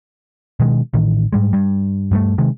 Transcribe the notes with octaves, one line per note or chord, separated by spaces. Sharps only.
B2 D#3 G#3
A1 A2 D#3
G#2 G3 G#3
G2 G3
G2 G3 A3
C3 D#3 G#3